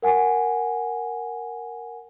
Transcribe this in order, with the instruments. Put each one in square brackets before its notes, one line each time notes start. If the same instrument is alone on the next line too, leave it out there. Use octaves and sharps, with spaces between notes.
[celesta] A#4 F#5 G#5